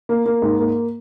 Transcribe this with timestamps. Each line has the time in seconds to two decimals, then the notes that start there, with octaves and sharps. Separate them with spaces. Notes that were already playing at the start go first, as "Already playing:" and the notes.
0.09 A#3
0.26 A#3
0.42 G#2
0.59 A#3